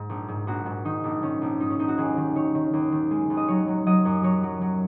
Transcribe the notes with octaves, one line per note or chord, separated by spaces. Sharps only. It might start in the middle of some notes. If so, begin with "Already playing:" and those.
Already playing: G#2
A#1
G#2
A#1 F#4
G#2
D#3 D#4
A#1
D#3 C#4
A#1
G#2 D#4
C#4
A#1 D#4
F#4
D#2 G#4
D#3
D#3 C#5
D#3
D#2
D#3
G#3
D#2
D#5
F#3 C#5
F#3
F#3 D#5
F#2
F#3 C#5
F#3
F#3